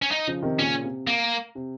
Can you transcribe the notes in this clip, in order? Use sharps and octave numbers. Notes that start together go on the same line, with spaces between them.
C#4
D#4
C#3 F3
C3 D#3
A#2 C#3 C#4
C3
A#3
C3